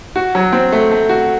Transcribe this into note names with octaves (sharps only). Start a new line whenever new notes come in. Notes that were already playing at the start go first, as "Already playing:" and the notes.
F#4
F#3
C4
A3
A3
F#4